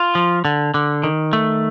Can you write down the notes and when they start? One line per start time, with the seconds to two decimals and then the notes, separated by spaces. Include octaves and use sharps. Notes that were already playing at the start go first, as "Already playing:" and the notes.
Already playing: F4
0.15 F3
0.45 D3
0.74 D3
1.04 D#3
1.33 A3